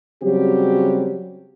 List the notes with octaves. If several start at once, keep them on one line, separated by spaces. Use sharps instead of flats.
C#3 F#3 G3 C4 G4